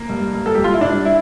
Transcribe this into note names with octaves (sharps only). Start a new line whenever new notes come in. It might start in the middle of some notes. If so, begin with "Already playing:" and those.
Already playing: A#3
G2
G2
A4
G2 G4
F4
E4
G2 D4
E4